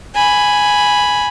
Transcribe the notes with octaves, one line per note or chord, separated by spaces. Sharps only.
G#5 B5